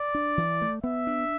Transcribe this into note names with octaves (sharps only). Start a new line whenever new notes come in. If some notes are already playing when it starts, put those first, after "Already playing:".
Already playing: D5
D4
E3
A3
B3 E5
D4